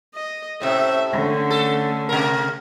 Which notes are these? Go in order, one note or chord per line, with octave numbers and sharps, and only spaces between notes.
D#5
A2 C3 C#4 E5
D3 A3 C#4
A4
C3 A#4